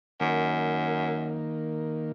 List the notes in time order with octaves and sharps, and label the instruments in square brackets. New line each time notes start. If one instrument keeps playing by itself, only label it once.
[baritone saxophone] F#2 [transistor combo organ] D#3 A#3